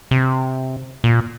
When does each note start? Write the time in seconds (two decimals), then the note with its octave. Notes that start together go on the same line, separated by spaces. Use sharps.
0.11 C3
1.04 A#2